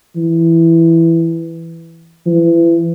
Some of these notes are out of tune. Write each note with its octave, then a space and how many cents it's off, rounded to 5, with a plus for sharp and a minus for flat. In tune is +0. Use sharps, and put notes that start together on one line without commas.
E3 +5
E3 +30